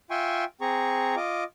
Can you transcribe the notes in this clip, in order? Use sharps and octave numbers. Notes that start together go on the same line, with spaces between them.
F4 E5 G5 G#5 C6 C#6
C4 G#4 A#5 C#6
F4 D#5 D6